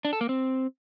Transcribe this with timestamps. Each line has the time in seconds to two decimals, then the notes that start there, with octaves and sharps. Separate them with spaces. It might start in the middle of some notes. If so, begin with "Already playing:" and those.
0.05 D4
0.13 A4
0.21 A#3
0.29 C4